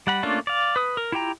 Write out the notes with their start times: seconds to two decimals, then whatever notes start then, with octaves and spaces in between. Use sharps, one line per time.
0.07 G3 F#5 B5
0.23 A3 A#3 C#4 D4 F4
0.47 D5 F5
0.76 B4 D#6
0.97 A#4
1.12 E4 F4 G4 G5 A#5